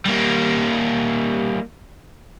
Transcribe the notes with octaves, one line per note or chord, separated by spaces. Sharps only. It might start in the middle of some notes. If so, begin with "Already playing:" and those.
G3 A#3